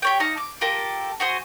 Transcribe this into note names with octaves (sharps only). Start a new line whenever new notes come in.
G4 C#5 G5
D#4 F5 A5 A#5
D6
F4 G4 A4 A#4
F#4 G#4 C5